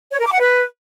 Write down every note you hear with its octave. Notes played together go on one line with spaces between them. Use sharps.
C#5
A#4
D6
F#5
B4